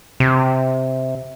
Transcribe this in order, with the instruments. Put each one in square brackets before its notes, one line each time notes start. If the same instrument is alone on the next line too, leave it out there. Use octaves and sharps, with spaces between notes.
[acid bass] C3